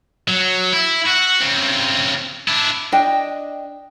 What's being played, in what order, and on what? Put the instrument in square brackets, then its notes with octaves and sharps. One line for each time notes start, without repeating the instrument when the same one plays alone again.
[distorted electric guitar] F#3
E4
F#4
C#3 C4
D4 E4
[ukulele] D4 D#5 G5